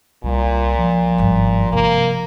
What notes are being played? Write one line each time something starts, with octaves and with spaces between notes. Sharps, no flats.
C2 A#2 G3
F3
G#1 G2
C3 A#3